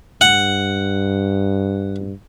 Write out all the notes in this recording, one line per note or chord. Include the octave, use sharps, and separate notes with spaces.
G2 F#5